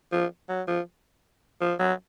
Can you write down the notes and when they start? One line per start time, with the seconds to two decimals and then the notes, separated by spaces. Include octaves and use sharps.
0.12 F3
0.49 F#3
0.67 F3
1.61 F3
1.79 F#3